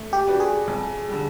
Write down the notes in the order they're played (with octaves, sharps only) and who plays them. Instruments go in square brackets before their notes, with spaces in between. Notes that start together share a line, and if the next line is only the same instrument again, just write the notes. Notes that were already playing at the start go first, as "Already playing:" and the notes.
Already playing: [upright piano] A3
[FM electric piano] G4
[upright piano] D4 F#4 B4 D5
[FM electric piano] G#4
[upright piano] F2
D3 G3